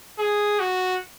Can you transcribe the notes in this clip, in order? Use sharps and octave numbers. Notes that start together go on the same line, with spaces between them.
G#4
F#4